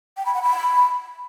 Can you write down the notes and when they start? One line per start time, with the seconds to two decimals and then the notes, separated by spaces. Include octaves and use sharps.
0.17 G5
0.26 B5
0.34 F#5
0.43 B5